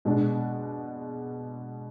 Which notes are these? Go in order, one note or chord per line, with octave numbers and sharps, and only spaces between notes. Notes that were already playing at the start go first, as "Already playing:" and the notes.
B2 G#3 D4